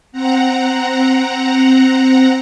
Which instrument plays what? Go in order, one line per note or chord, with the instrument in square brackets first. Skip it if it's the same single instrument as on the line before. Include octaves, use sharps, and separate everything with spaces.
[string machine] C4 F#5 A#5